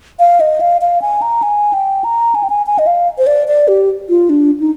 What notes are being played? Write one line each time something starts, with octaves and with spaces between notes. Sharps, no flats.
F5
D#5
F5
F5
G#5
A#5
G#5
G5
A#5
G#5
G5
G#5
G#5
D#5
F5
C5
D5
D5
G4
F4
D4
D#4